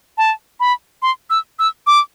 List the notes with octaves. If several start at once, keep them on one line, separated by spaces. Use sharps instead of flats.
A5
B5
C6
E6
E6
D6